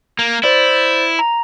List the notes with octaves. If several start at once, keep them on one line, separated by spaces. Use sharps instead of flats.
A#3
E4 C5 D5
A#5